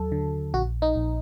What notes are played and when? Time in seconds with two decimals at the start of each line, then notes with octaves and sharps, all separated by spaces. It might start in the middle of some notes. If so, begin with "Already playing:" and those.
Already playing: D#2 F#3 A4
0.12 D3
0.54 A#1 F#4
0.82 D#4
0.96 A#1